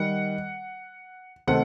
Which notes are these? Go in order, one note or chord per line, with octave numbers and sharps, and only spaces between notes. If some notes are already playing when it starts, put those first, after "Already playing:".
Already playing: D#3 G3 F#5
C3 D#3 A3 F#5